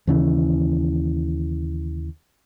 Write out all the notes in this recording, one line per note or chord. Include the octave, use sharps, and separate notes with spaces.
D#2 C#3 E3